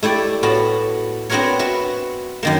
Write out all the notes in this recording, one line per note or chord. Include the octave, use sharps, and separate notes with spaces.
A3 E4 G4 D5
A2 B3 F#4 A5
B3 C4 D4 F#4 A#4 C#5
F#4 B4 E5
F#2 D#3 A#3